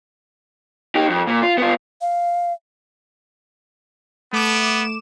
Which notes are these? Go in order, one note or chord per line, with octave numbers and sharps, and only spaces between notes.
D#4 G4
F2
A#2
F4
B3 F4
F5
A3 B3 D6 E7